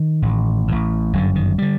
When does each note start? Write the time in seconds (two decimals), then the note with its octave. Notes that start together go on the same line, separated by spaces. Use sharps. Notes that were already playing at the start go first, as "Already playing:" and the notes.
Already playing: D#3
0.22 A1 A2
0.68 A1 A2
1.13 G1 F#2 D3 F#3
1.35 D#3
1.58 D3 G3